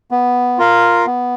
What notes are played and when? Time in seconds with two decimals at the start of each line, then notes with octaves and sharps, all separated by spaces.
0.11 B3
0.58 F4 A#4 F5
1.06 B3